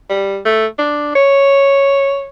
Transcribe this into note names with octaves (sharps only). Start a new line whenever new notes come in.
G3
A3
D4
C#5